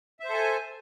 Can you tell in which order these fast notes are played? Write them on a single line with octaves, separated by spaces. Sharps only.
E5 C5 A4 G#5